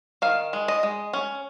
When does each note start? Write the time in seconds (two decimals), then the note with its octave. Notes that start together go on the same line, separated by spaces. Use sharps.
0.22 D#3 F5
0.53 G#3
0.68 D#5
0.83 G#3
1.13 C#4